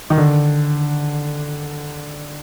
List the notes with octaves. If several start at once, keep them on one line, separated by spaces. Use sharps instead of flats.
D#3
D3